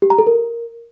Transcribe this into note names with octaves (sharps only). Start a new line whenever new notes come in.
G4
A#5
A4
A#4